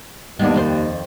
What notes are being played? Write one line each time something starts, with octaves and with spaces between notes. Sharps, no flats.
D#2 G#3 B3 D4
F2 D#3 C5